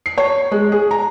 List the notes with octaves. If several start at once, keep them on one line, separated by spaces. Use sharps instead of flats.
C7
C#5
G#3
G#4
A#5